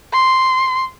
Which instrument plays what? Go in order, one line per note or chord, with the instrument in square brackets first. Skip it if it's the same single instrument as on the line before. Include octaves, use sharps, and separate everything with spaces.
[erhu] C6